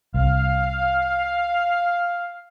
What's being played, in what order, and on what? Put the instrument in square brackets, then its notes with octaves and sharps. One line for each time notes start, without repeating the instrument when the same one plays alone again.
[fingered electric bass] C2 [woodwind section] F5